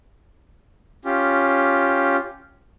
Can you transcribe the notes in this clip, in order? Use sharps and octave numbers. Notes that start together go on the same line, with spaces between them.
C#4 F4 G4